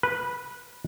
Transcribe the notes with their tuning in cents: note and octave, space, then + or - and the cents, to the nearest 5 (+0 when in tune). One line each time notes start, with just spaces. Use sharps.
B4 -10